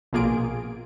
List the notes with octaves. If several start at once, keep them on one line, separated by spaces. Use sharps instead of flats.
A#1 B2 A#3 F4 G#4 D7